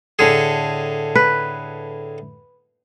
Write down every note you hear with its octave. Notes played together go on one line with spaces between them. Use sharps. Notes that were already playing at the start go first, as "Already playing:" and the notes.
A2 D3 G#4
B4